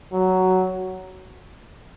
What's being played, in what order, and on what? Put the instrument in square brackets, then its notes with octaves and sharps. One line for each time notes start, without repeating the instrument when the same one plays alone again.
[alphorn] F#3